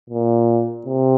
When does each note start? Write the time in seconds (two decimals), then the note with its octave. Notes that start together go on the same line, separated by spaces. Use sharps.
0.10 A#2
0.87 C3